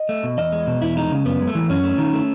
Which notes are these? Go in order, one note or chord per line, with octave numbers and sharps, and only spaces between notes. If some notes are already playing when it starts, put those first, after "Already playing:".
Already playing: D#5
A3
B2
E2 D#5
G#3
B2
E2 E4
G#3 D#4
C#3
F#2 B3
G#3
A3
E3
F#2 C#4
A3
D#3
A3